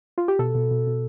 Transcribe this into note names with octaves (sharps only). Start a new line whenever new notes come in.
F4
G4
B2 A4
B2
B2
B2